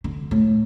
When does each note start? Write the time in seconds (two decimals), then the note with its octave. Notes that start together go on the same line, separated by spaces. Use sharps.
0.04 D3
0.31 A2